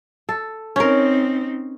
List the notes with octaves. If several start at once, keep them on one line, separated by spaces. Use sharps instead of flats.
A4
C4 C#4 D#4 A#4